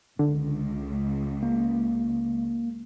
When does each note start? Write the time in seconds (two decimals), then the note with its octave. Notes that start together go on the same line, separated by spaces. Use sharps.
0.19 C#2 D3
1.43 A#3